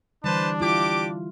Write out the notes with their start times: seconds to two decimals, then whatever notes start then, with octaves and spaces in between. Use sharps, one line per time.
0.24 D3 E3 G3 D4 B4 C5 A5
0.60 E4 F4 G4 D6